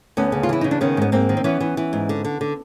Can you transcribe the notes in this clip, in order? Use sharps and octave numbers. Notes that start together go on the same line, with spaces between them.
D2 B3 C#4
C#3
F4
E3 E4
C#3 D#4
D4
D#3 B3 C#4
G#2 B3
G#2 A#3 C4
D#3
C4
E3 B3 C#4
E3
E3
G#2
D3
D3
D3